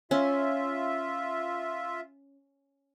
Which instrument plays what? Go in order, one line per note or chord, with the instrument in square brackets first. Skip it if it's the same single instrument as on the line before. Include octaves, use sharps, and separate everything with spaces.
[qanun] C#4 [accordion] F4 E5